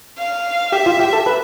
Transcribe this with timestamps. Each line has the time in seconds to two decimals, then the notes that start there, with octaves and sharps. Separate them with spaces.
0.18 F5
0.72 G4 E5
0.86 F4
1.00 G4
1.13 A4
1.26 B4